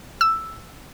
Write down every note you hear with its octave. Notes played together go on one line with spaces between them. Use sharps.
E6